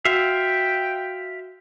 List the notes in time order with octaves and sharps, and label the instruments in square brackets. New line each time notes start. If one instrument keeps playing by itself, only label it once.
[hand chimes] F#4 [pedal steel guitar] E5 F5 [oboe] G5